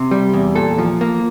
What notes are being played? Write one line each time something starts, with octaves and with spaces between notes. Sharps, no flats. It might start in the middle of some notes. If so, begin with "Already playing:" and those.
Already playing: C3
G3
E2
A#2 A4
F3
A#3